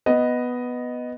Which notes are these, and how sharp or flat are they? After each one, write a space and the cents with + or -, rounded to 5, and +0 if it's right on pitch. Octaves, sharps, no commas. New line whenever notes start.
B3 +0 D#5 +0